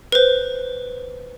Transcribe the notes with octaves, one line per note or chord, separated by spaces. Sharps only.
B4 C5